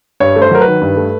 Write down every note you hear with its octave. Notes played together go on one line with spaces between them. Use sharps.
G2 C#5
A3
C5
F#3 A#4
B4
D#3
G2
A3